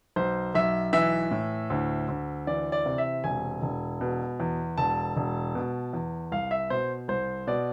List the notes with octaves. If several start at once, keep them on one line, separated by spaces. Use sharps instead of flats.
B1 C5
B1 E5
E3 E5
A2
D2
D2
E3 D5
D5
C3
E5
E1 G#5
E1
B2
E2
E1 A5
E1
B2
E2
C2 F5
E5
B2 C5
C2 C5
B2 D5